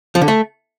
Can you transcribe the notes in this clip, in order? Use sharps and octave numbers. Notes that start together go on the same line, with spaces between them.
F3
D3
A3